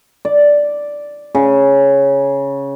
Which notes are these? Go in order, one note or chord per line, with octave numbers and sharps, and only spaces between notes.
D5
C#3